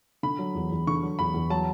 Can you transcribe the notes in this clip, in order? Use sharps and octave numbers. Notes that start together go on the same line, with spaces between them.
D3 B5
F#3
E2
E2
D3 C#6
F#3
E2 B5
E2
F#3 A5